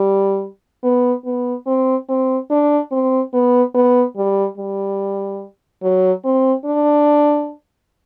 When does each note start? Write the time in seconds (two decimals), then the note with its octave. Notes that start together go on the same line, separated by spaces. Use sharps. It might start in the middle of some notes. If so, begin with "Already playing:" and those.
Already playing: G3
0.83 B3
1.25 B3
1.67 C4
2.09 C4
2.50 D4
2.92 C4
3.33 B3
3.75 B3
4.17 G3
4.58 G3
5.83 F#3
6.24 C4
6.65 D4